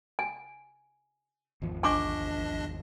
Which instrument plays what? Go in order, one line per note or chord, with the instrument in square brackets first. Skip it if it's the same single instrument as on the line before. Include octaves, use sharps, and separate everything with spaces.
[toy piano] G#5
[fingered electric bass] G#1 E2 F3
[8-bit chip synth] A#1 D4 D#5 [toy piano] G#5 C#6 D6